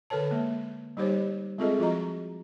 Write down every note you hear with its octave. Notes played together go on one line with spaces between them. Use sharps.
D3 A4 B4 C#5 A5
G#3 A#3
G3 D#4 G4 C5 C#5
G#3 C4 F4 G#4 A4 D#5
F3 F4 F#4 D#5 A#5